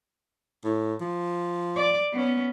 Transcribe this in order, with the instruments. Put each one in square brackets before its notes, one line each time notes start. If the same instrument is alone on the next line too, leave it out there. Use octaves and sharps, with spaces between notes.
[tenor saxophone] A2
F3
[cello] D5
B3 C#4